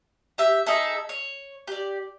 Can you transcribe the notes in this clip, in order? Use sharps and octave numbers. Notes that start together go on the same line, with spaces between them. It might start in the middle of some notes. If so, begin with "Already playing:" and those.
G4 E5
D#4 G#4 A4 E5
C#5
G4 D5